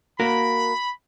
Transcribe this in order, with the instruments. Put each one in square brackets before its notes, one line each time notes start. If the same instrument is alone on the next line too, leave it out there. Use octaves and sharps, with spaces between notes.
[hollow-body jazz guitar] A#3 F#4 A#4 [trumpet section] B5